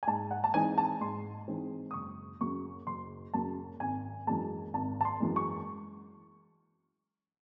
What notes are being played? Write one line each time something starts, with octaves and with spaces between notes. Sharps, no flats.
G#5
G#2 A5
F#5
A5
E3 G#3 C4 D#4 G#5
A5
G#2 C6
E3 G#3 C4 D#4
D#6
F#1 C#6
F#2 C#3 C#6
F#1 C6
F#2 C#3 A5
G#1 G#5
F#2 E3 G#3 A5
G#1 A5
A5
C6
F#2 E3 G#3
C#6